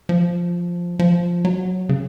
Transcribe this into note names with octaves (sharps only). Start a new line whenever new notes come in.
F3
F3
F#3
C#3